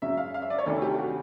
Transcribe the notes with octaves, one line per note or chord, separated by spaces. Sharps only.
F#2 C#3 F#3 E5
F5
F5
E5
D5
C#5
D2 C3 D#3 A4
G4
F#4